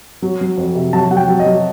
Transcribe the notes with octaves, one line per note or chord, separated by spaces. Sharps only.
F#3
F#3
F2
C3
F#3 A5
F#3 F#5
G5
F#3
D#5
F#3